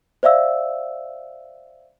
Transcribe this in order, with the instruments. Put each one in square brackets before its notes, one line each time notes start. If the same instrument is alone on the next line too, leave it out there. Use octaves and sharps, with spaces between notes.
[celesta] C5 D5 E5 F5 E6